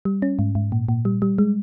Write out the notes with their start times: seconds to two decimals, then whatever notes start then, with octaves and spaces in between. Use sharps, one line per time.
0.05 G3
0.22 C#4
0.39 G#2
0.55 G#2
0.72 A#2
0.89 A#2
1.05 G3
1.22 G3
1.38 G#3